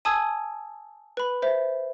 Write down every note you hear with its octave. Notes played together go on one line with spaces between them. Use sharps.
G#5 A5 D#6 E6 G#6
B4 B5
C5 E5